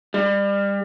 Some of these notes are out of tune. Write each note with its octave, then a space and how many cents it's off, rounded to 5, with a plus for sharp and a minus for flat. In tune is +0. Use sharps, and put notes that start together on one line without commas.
G3 +30